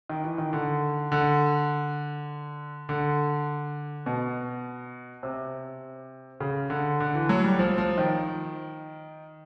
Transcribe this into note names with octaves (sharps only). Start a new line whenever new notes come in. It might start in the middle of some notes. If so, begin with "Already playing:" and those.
D#3
E3
D#3
D3
D3
D3
B2
C3
C#3
D3
D3
E3
F#3
G3
F3
F3
D#3